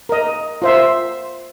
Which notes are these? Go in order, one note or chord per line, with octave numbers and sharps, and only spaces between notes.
A#4 D#5
F4 C5 E5